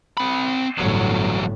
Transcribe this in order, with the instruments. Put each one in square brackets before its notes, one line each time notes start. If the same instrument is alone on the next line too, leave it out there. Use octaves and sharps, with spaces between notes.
[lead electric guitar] C4 B5
[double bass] G1 A2 [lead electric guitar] E2 F#3